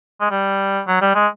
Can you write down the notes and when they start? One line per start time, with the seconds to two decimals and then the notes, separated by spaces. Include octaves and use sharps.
0.21 G#3
0.31 G3
0.88 F#3
1.02 G3
1.15 G#3